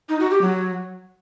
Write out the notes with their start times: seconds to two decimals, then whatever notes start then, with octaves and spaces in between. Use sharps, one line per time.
0.09 D#4
0.20 F#4
0.31 G4
0.41 F#3